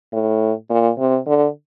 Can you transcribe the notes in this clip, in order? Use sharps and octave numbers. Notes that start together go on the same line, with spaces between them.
A2
A#2
C3
D3